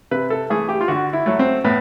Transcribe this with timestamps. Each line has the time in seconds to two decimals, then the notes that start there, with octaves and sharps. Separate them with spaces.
0.11 C3 B4
0.30 A4
0.50 E3 A3 G#4
0.69 G4
0.81 F4
0.88 D3 F#4
1.13 E4
1.26 F#3 A3
1.39 C4
1.64 A2 B3